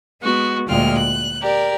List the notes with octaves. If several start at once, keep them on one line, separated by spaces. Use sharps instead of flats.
G#3 B3 F#4
D2 A#2 G#3 F4 G5 F6
F#6
G4 A#4 D5